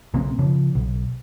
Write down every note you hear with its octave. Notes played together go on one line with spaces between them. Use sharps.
B1 C#3 A#3 C4
C#3 F3
B1